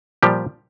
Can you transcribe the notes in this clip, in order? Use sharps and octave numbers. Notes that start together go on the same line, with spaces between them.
A#2 F3 G3 G4